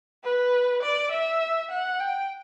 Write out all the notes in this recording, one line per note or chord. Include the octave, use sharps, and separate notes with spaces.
B4
D5
E5
F#5
G5